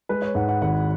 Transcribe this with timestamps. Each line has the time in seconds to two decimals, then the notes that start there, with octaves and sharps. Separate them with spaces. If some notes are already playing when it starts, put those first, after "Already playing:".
0.09 G#3 B4
0.22 C#5
0.35 G#2 F#5
0.49 F#5
0.62 G#1 F#5